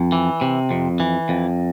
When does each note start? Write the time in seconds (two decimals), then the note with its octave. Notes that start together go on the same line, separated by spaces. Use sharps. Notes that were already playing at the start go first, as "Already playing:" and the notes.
Already playing: F2
0.12 E3
0.41 C3
0.71 F2
1.00 E3
1.29 F2